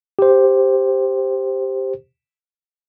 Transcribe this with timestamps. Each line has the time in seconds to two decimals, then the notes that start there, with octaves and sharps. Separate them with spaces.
0.19 G4 C5